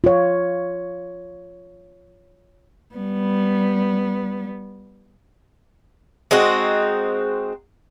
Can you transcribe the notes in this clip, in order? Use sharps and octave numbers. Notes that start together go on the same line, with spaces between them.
F4 C#5
G3 B3
G#3 C4 D#4 F#4